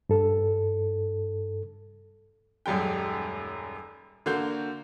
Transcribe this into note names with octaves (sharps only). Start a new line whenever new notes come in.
G2 A4
D#1 F#2 G3 G#3 G5
D3 A#3 F#4 G6